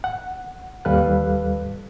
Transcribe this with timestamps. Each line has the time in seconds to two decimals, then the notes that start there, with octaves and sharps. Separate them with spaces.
0.04 F#5
0.85 D#2 G3 A4 B4 F5 F#6